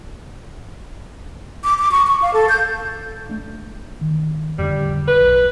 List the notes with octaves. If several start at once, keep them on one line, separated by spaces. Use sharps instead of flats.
D6
D6
C#6
C#6
F5
A4
G6
A3 D4
D#3
F2 A2 D3 G3
B4
B1